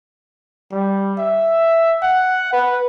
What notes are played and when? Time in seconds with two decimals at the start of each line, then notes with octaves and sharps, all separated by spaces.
0.72 G3
1.18 E5
2.02 F#5
2.53 B4